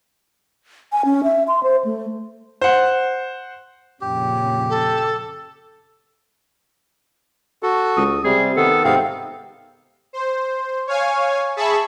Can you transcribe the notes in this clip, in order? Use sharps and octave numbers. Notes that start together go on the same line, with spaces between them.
G#5
C#4
E5
C6
C5
A3
C5 F#5
F2 A#2 C#3 G4
A4
F#4 A4
C#2 D#6
C3 G3 G#4
D#3 B3 A4
G#2 C3 B3 C4 F5
C5
C#5 F5 G#5
G#4 E5 A5 B5 C#6